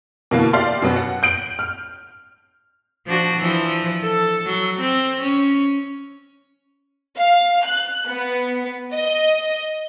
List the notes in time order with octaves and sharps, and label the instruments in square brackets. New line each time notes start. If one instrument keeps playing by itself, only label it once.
[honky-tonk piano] B2 D3 E3 A#3 B3
G4 D5 E5 F5 C6 F6
F#2 B2 B3
F#5
G6 D7 F#7
F6
[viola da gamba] F3 D4 F#4
E3 F3
A4
F#3
C4
C#4
[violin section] F5
F#6
B3
D#5